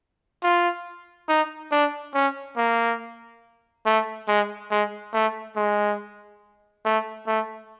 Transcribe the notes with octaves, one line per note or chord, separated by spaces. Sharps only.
F4
D#4
D4
C#4
A#3
A3
G#3
G#3
A3
G#3
A3
A3